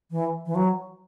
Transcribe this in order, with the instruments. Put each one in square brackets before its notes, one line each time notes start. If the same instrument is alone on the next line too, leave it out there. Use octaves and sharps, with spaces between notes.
[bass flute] E3
E3
F#3